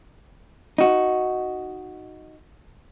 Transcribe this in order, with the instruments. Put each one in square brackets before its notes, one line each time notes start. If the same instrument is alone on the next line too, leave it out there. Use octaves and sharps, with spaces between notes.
[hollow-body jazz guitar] D#4 F#4